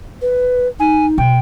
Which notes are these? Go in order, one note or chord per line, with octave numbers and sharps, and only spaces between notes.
B4
D#4 G#5
B2 G5